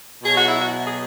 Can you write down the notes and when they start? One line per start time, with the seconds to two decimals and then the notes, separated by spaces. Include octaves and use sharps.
0.23 B2 F#3 G#4
0.36 F#4
0.47 E4
0.60 F#4
0.85 G#4